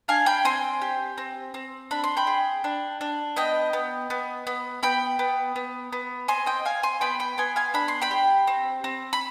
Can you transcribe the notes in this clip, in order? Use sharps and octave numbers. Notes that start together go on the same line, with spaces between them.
D4 F5 G#5
G5 B5
C4 G#5 C6
G4
C4
C4
D4 B5
C6
G5 B5
G#4
D4
D4
B3 D#5 G5
B3
B3
B3
B3 G5 B5
B3
B3
B3
C4 G#5 C6
D#5 G5
C4 F5 G#5
G#5 C6
B3 G5 B5
G5 B5
B3 G#5 C6
F5 G#5
D4 B5
C6
G5 B5
G4
C4
C4
B5